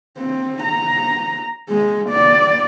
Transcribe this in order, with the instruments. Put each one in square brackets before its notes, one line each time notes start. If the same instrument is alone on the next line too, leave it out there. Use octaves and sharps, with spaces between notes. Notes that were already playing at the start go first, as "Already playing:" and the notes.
[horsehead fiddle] C4
A#5
G#3
D5